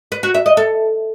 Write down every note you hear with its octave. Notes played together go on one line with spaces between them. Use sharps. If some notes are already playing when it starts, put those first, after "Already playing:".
B4
F#4
E5
D#5
A4